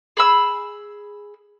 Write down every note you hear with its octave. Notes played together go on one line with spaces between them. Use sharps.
G#4 B5 E6